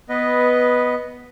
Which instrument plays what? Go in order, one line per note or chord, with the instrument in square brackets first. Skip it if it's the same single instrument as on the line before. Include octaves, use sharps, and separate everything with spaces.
[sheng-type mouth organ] B3 B4 D#5